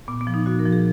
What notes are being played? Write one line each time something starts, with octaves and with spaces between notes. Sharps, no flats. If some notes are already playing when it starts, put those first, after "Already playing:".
A#2 B3
B3
F3
D#4
A#2 F#4
A#4
F3
G#4